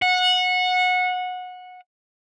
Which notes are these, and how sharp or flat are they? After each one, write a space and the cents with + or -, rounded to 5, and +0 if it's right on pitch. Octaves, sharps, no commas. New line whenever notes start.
F#5 -20